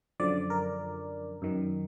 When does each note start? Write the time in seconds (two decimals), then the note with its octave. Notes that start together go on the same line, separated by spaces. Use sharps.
0.20 F#2 D3 F3 D5
0.50 A#4
1.42 F#2 D#3